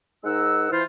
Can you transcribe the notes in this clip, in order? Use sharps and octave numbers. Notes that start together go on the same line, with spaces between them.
G#2 G#3 D#4 A#4 F#5 E6
E3 E4 F4 C5